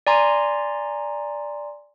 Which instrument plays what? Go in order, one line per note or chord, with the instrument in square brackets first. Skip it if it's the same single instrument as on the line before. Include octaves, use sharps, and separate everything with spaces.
[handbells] D5 G#5 A#5 C6